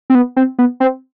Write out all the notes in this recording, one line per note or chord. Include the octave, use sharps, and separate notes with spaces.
C4
B3
C4
B3
C4